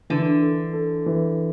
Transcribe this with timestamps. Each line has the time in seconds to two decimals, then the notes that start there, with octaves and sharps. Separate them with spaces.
0.10 D3 E3
0.41 A4
0.73 A4
1.06 E3